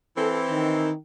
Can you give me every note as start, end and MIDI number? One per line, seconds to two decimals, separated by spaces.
0.17 0.90 52
0.17 0.90 60
0.17 0.37 69
0.50 0.92 51